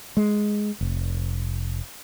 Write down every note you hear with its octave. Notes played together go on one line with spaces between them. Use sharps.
G#3
F1